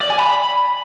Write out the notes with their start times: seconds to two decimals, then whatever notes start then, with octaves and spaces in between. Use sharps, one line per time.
0.01 D5
0.10 G#5
0.20 B5